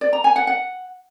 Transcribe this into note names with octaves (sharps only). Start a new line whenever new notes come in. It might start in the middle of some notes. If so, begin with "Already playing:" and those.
D5
A#5
G#5
F#5
F#5